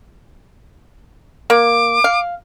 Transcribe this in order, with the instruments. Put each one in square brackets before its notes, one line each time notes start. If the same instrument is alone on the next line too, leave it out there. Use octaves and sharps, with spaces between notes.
[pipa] A#3 [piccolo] D6
[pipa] F5